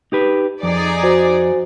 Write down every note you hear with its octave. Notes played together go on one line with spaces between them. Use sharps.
D#4 G4 B4
F2 D#4 G#4 D5
F#4 C5 G#5